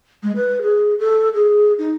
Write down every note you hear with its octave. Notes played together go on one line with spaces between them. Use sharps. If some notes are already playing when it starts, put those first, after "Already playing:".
G#3
B4
G#4
A4
G#4
D#4